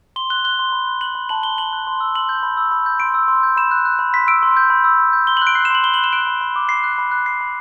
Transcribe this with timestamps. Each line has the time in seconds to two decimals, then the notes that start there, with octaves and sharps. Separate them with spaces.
0.16 C6 G7
0.30 F#6 G7
0.44 F#6 G7
0.59 C6
0.73 B5
0.87 F#6
1.01 F#6 F#7
1.15 B5
1.29 A5 F#7
1.43 C6 G7
1.58 A5 F#7
1.73 F#6
1.87 C6
2.00 E6
2.15 C6 F#7
2.29 G6
2.43 B5
2.57 E6
2.71 B5
2.86 G6
3.00 C6 D7
3.14 E6
3.28 C6
3.43 G6
3.57 B5 E7
3.71 F#6
3.85 F#6
3.99 B5
4.14 C6 B6
4.27 E6 D7
4.43 C6
4.57 G6
4.70 B5
4.84 E6
4.99 B5
5.13 G6
5.27 C6 G7
5.37 F#7
5.42 F#6
5.47 D7
5.55 F#6 C7
5.65 E7
5.70 C6 F#7
5.84 B5 G7
5.94 F#7
5.98 F#6
6.04 E7
6.13 F#6 D7
6.27 B5
6.41 B5
6.56 D6
6.69 B5 C7
6.84 F#6
6.98 B5
7.12 F#6
7.26 F#6 C7
7.41 B5